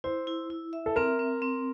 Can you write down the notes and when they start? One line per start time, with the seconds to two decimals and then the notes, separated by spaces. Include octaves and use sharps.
0.04 E4 C5
0.27 E4
0.50 E4
0.73 E5
0.86 A4
0.96 C4 A#4
1.19 C4
1.42 C4